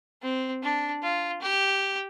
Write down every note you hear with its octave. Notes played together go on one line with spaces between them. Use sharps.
C4
D4
F4
G4